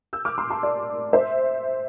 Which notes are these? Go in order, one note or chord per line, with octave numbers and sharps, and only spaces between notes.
E6 G6
D6 F6
C6 E6
A5 C6
D5
C5 E5